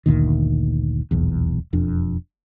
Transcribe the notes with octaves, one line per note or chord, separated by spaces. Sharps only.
F#1 D2 A#2 D#3
D#1 B1 E2
E1 F2 D4